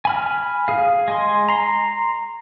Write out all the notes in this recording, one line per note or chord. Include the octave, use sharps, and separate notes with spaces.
G#5 B5 F6
G#4 F5
G#3 G#5 C6
A#5 C6